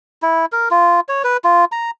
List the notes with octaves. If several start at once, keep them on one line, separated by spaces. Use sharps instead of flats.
E4
A#4
F4
C#5
B4
F4
A#5